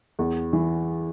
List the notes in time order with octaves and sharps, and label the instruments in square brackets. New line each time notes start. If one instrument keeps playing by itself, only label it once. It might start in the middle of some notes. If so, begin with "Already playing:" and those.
[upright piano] E2
E3